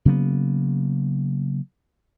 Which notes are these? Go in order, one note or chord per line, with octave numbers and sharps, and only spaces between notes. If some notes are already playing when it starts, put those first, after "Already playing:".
C#3 F#3 A#3 B3